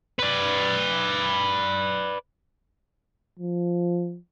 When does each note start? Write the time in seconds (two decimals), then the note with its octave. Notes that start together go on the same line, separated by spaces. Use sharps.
0.19 B4 D5
3.39 F3